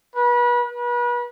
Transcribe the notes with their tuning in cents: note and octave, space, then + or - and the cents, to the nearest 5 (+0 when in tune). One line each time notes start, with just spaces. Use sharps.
B4 -30
B4 -35